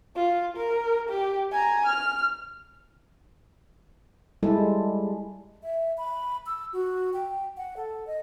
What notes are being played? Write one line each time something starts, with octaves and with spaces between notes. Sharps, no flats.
F4
A#4
G4
G#5 A#5
F6
G3 G#3 E4 A4
E5
B5
E6
F#4
G5
F#5
A4
D#5